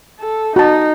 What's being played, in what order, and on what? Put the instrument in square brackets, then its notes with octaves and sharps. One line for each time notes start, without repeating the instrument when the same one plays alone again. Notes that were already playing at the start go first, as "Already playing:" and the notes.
[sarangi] A4
[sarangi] D#4 [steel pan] F#4 A5